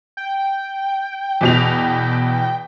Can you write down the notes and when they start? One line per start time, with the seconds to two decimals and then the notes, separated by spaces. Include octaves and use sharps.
0.17 G5
1.41 E2 B2 F7